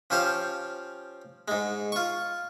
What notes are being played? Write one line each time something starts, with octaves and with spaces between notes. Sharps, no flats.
F3 C#4 G4 C5 F5
G#2 G#3
F4 C#6